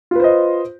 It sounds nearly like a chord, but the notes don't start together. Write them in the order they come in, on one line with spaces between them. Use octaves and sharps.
F4 B4 C5 D#5